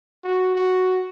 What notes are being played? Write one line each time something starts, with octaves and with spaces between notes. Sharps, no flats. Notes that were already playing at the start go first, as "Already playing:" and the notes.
F#4
F#4